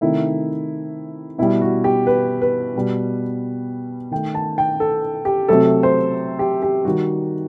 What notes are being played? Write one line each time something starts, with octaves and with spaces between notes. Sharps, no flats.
C3 D#3 A3 E4
B2 G3 E4
F#4
G4
B4
B4
B2 G3
D#3 A3 G5
A5
G5
A4
G4
C3 F#3 A3 A4
C5
G4
G4
D#3 G3 F#4